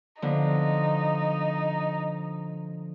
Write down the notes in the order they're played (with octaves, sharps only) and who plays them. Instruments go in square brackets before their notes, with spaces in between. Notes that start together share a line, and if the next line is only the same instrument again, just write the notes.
[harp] D3 F3 B3 [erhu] D#4